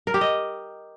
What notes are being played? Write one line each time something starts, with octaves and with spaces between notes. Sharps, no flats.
A#4
G4
D#5